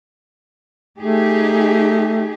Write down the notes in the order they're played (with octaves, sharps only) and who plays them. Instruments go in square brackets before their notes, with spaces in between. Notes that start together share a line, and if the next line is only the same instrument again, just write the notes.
[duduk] A3 [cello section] D#4 G4 G#4